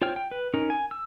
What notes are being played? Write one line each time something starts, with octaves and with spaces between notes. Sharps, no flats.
F4 C5 C#5 G5 F6
G5
B4
C#4 D#4 A#4
G#5
E6